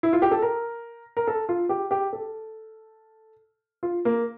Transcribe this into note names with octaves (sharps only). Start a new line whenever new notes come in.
E4
F4
G4
A4
A#4
A#4
A4
F4
G4
G4
A4
F4
A#3